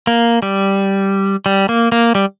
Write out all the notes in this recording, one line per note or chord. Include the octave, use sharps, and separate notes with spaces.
A#3
G3
G3
A#3
A#3
G3